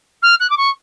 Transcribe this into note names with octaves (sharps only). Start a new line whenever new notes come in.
F6
F#6
D6
C#6